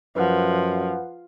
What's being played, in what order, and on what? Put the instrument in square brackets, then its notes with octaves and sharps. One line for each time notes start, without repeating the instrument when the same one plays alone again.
[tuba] F#2 [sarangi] F3 [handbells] B4 F#5